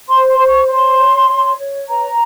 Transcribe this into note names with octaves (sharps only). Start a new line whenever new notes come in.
C5 C6
C6
C5
C#6
C#5 C6
C#5
C#5
C#5
B4 A#5